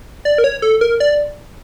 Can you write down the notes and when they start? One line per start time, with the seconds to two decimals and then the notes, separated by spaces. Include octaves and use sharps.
0.25 D5
0.38 A#4
0.44 C#5
0.62 A4
0.81 A#4
1.00 D5